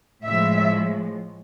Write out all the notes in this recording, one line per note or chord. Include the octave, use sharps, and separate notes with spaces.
A2 F3 G#3 E5